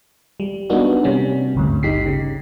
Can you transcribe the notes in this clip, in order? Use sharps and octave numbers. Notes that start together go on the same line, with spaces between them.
G3
G3 A#3 B3 D4 D#4 F#4
C3 G3 C#4
G#1 D2 G2
G3 D#4 G4 B6 C7
C#3